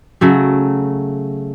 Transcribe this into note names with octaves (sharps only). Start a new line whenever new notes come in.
C#3 F#3 A3